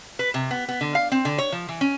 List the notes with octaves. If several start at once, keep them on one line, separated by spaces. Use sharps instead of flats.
B4
C3
B3
B3
D3
F5
C4
D3
C#5
F3
E3
C#4